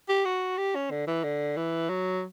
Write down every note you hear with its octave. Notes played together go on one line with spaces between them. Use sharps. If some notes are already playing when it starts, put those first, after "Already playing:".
G4
F#4
G4
C#4
D3
E3
D3
E3
F#3